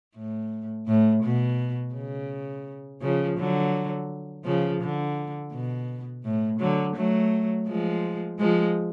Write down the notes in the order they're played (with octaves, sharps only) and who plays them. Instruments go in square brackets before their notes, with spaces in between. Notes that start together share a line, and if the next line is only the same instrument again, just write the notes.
[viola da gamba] A2
A2
B2
C#3
C#3 F3
D3 F#3
C#3 F3
D3
B2
A2
D3 F#3
F#3 A3
F3 G#3
F3 G#3